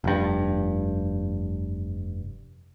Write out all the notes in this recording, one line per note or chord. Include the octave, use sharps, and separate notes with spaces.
F1 G2